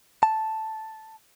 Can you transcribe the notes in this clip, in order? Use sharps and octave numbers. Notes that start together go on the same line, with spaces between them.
A5